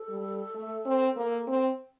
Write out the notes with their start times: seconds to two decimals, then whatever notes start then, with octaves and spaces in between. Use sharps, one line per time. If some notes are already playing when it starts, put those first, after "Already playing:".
Already playing: A4
0.09 G3
0.55 A3
0.85 C4
1.16 A#3
1.47 C4